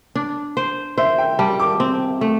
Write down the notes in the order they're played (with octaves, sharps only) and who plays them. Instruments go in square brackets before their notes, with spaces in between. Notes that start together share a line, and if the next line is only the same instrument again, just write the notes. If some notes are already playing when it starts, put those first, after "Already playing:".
[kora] D4
C5
[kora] C5 [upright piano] E5
[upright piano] G5
[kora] G3 [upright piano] A5
[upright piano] D6
[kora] C4
A3